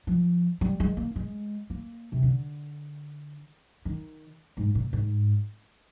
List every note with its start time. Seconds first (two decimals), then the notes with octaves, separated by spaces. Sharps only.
0.07 F3
0.61 G3
0.80 G#3
0.97 A#3
1.16 G#3
1.70 A#3
2.12 C3
2.23 D3
3.85 D#3
4.57 G#2
4.75 A#2
4.93 G#2